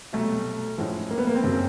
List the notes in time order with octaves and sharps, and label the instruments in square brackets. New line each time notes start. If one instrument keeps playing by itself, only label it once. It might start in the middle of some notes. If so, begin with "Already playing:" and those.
[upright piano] C2 B2 F#3 [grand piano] A3
[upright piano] A2 F3 G#3 C#4 E4
[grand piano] A#3
B3
A#3
C4
[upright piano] F#1 F#2 C#3 F#3 A#3